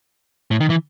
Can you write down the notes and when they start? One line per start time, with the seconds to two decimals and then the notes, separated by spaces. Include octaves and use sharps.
0.51 A2
0.61 D#3
0.70 E3